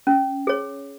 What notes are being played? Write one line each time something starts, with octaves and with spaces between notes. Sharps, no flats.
C#4
G#4 C#5